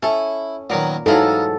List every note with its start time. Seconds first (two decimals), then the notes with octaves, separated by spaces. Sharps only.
0.03 C#4 E4 A4
0.70 A#2 D#3 F#3 B3 A#4
1.06 G#2 E3 F#3 D#4 F4 A4